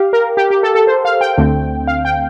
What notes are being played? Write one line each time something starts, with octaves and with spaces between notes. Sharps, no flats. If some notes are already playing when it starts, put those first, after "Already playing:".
Already playing: G4 F5
A#4
G4
G4
A4
A4
C5
F5
G5
D2 D3 A3 C4
F5
G5